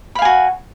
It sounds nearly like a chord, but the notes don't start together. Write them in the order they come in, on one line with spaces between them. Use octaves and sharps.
B5 F5 G#5 F#4